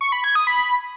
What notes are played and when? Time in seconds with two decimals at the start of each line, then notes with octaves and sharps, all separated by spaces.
0.01 C#6
0.12 B5
0.24 G#6
0.35 D#6
0.47 B5